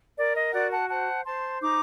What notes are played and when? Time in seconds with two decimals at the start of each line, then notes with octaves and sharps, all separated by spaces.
0.17 A#4 D5
0.35 D#5
0.53 F#4 D5 F#5
0.70 F#5 A5
0.89 C5 F#5 A5
1.25 C5 A5 C6
1.61 D#4 A#5 D6